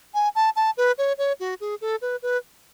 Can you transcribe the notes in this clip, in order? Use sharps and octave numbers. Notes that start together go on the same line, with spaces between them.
G#5
A5
A5
B4
C#5
C#5
F#4
G#4
A4
B4
B4